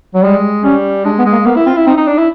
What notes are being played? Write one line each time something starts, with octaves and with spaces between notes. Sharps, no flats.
F#3
G3 G#3
G3 C#4
G#3 D4
B3
G#3
A#3
A#3 B3
E4
C4 F4
E4
C4 D#4
D#4
D4
E4